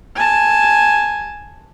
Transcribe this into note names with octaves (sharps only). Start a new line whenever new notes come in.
G#5 A5